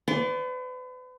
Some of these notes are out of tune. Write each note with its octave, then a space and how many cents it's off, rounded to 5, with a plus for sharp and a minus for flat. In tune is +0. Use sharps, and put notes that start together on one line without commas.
B4 +40 D5 -20 C6 +20